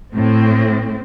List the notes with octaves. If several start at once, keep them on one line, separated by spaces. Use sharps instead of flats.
A2 C4